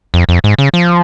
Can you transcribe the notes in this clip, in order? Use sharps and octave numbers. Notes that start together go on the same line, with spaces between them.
F2
F2
G#2
C#3
F3